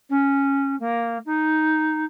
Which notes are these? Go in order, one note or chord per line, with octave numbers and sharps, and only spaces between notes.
C#4
A#3
D#4